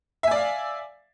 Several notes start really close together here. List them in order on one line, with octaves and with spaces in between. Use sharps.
E5 G#5 D5 F5